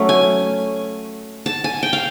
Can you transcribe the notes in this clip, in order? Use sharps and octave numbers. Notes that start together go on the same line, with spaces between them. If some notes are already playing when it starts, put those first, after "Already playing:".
Already playing: F#3 A3 C#4
G#5
A5
G#5
G5
F5